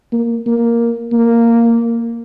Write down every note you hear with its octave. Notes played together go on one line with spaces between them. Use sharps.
A#3
A#3
A#3